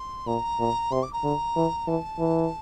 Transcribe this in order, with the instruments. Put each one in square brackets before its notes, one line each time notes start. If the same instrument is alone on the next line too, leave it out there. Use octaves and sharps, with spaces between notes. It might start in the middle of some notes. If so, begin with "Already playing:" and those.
Already playing: [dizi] C6
[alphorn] A#2 [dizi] A#5
[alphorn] A#2
[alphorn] C3 [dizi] C6
[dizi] D6
A#5
[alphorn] D3
E3
[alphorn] E3 [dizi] A5
[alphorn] E3